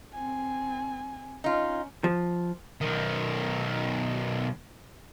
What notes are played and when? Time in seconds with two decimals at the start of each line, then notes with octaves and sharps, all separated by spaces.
0.14 C4 G#5
1.44 C#4 D#4 F4
2.04 F3
2.81 B1 D#3